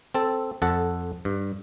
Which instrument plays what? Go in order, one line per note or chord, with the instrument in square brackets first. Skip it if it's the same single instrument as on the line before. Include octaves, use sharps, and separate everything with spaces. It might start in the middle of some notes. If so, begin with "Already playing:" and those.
[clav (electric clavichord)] C4 A4
F2 A4 F#5
G2